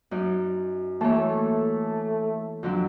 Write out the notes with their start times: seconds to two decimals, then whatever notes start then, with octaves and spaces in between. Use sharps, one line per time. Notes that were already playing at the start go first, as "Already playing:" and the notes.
0.11 F#2 D#4 D5
1.01 E3 A3 A#3 C#5
2.63 F2 D3 F#3